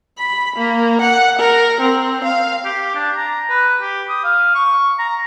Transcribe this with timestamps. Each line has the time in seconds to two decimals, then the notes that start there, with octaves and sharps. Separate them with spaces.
0.18 B5
0.56 A#3
1.01 F#5
1.39 A#4
1.80 C4
2.24 F5
2.65 G4
2.95 D4
3.16 A#5
3.49 B4
3.81 G4
4.09 D#6
4.24 F5
4.55 C#6
4.99 A#5